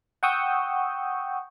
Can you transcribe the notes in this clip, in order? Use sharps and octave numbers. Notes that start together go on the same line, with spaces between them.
F#5 G5 C#6 D#6 E6 G6